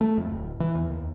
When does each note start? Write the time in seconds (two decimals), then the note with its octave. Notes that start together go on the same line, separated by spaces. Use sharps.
0.01 A3
0.18 F2
0.29 D1
0.60 E3
0.75 E2
0.90 D#2